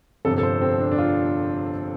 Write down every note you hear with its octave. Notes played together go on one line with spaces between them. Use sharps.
G1 F2 C3 F3 A4
A4
C5
C4
D4
D4
F4